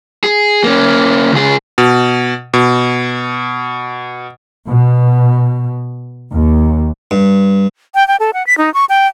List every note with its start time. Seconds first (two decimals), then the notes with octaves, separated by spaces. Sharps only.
0.24 G#4
0.64 A#3 C#4
1.32 C#2 G#4
1.78 B2
2.54 B2
4.67 B2
6.31 D#2
7.11 G2
7.95 G5
8.08 G5
8.20 A4
8.34 F#5
8.47 B6
8.58 D#4
8.74 C#6
8.89 G5